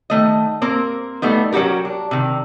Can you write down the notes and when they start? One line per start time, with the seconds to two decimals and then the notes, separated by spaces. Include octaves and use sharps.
0.10 D#3 A3 D#5
0.62 A#3 C4 A#4
1.22 G3 A3 B3 D#4
1.52 F#3 C#4 F#4 G4 A#4
1.85 D4
2.11 C3 D#3